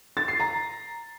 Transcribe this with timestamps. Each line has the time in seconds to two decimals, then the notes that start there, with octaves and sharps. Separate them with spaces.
0.17 A6
0.28 C7
0.40 A#5